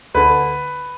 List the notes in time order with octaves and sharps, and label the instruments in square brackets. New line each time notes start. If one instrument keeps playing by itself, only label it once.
[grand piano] D2 D3 B4